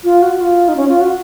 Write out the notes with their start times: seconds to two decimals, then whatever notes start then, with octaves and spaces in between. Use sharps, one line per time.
0.04 F4
0.22 F#4
0.41 F4
0.68 D#4
0.76 C#4
0.89 F4
1.01 F#4